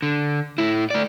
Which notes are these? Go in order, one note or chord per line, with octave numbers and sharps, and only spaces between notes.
D3
A2 E4
A3 D5